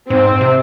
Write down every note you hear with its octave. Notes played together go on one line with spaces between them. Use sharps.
G#2 C4
C3